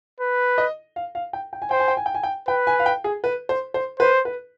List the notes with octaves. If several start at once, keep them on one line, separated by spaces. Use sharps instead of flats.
B4
D#5
F5
F5
G5
G5
G#5
C5 G5
G#5
G5
G#5
G5
G#5
G5
B4 G5
G#5
F5
G5
G#4
B4
C5
C5
B4 C5
B4